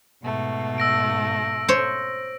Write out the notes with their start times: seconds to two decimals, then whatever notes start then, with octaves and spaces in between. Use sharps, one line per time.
0.23 G#2 B2 A3
0.78 E6 A#6 D7
1.68 C5 C#5